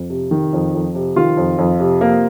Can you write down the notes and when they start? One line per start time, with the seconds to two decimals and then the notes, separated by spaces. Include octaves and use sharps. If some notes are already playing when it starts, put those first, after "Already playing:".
Already playing: F2
0.10 C3
0.31 D#3
0.53 F2
0.74 F2
0.95 C3
1.16 D#3 F4 F5
1.37 F2
1.58 F2
1.80 C3
2.01 A#3